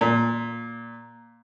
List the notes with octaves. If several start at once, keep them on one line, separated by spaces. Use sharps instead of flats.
A#2